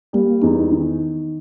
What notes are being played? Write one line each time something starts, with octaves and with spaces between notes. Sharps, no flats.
G3 A#3
E2 D#4
D#3